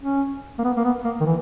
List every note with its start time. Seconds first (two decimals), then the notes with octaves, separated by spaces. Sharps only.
0.03 C#4
0.58 A#3
0.64 B3
0.77 A#3
0.84 B3
1.04 A#3
1.20 D#3
1.26 E3